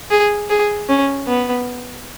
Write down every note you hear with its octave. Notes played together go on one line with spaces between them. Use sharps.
G#4
G#4
C#4
B3